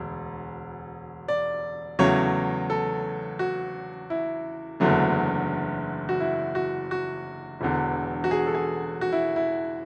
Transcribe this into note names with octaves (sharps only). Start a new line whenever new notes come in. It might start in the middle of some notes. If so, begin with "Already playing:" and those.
Already playing: E1 D2
D5
E2 C#3 F#3 A3 C#5
A4
F#4
E4
F#1 E2 D3 F#3 A3
F#4
E4
F#4
F#4
E1 E2 D3
F#4
G#4
A4
G#4
F#4
E4
E4